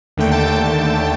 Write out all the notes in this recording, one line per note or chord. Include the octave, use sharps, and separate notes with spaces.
D#2 D3 A3 G5
A5